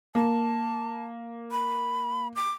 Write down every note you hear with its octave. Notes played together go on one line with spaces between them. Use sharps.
A#3 A5
B5
D6